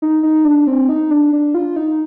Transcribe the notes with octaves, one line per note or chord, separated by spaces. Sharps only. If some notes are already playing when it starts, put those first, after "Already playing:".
D#4
D#4
D4
C4
D#4
D4
D4
F4
D#4